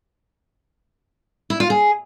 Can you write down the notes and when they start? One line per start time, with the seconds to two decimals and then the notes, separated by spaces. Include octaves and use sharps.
1.50 E4
1.60 F4
1.70 G#4